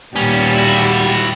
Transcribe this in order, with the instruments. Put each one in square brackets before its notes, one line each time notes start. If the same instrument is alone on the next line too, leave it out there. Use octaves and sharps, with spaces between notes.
[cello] D#2 A#2 [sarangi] G3 [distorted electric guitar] B3 C#4
[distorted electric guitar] E4 F#4